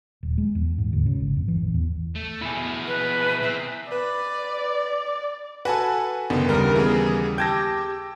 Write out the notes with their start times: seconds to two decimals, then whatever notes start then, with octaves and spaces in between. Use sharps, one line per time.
0.23 D#1
0.38 G#3
0.55 E2
0.78 G#2
0.93 D2
1.06 C#3
1.20 G#1
1.37 F2
1.48 E3
1.61 A1
1.74 E2
2.16 A3
2.42 B2 E4 G#4 A4
2.55 B2
2.87 B4
3.43 C4 C5 E5
3.92 B4 D5
5.65 F#4 A4 B4 G#5 A5
6.30 F#1 D3 D#3 B3
6.48 D#2 C#3 G3 A#4
6.75 E3 B3 G#4
7.38 G4 G5 A5 E6 G6 G#6 A#6